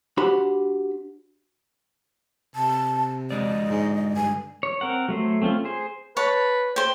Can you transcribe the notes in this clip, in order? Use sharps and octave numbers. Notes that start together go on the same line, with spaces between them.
D4 F#4 G4 C5 B5
C3 A5
D3 G#3 D5 D#5
G#2
G2 G#5
C#5
C4 A#4 F#5
F#3 A3 C5
A3 C4 C#4 F4
G#4 C5
B4 C#5 A5
C5 G5